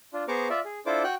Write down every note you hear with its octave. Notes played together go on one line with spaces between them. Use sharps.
D4 F4
B3 G#4 C5 A#5 C#6 D6
F4 D5 E5
G#4
D4 E4 F4 A4 C5 D6
F#4 G5 F#6